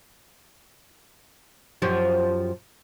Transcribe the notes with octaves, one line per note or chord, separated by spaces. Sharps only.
F#2 F3 G4